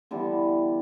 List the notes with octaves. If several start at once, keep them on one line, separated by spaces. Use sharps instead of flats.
D3 E3 G3 B3